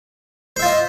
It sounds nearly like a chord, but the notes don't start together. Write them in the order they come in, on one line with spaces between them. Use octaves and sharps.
C5 E5 F4 D#5